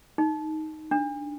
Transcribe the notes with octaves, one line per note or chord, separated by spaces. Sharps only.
D#4
D4